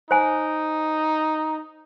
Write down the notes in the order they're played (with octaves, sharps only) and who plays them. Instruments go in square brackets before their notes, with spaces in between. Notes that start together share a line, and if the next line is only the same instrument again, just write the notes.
[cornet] D#4 [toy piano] C5 G#5